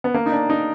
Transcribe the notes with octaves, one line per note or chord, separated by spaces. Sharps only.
B3
A#3
D#4
D4
D#4